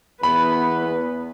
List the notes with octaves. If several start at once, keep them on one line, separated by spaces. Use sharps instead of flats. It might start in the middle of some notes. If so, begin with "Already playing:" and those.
E2 B3 B4 B5